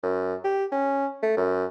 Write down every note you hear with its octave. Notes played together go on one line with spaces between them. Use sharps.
F#2
G4
C#4
A3
F#2